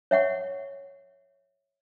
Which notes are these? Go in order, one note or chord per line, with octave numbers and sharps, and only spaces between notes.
C#5 E5 F#5 C#6